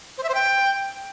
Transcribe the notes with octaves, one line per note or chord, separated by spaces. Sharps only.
C5
E5
C5
G5